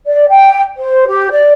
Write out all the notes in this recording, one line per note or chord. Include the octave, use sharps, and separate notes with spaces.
D5
G5
C5
G4
D5